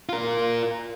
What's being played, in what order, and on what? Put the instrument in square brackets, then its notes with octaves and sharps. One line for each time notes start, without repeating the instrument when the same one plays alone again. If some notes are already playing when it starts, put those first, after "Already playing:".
[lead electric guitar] F4 A#4